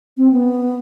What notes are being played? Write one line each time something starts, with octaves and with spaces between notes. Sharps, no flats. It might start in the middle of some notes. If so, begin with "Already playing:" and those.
C4
B3